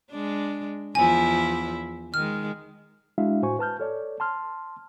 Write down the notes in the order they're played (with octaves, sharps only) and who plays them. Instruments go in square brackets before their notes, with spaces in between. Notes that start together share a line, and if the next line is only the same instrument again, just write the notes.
[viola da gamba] G#3 D4
[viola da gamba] E2 F3 E4 [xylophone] G#5
[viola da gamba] D#3 G#3 [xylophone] F6
[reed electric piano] G#3 D4 E4 F#4 E5 F5
A2 F#4 C5 G#5 C#6
B4 A5 F6 G6
A4 C#5 D5
A5 C6 F6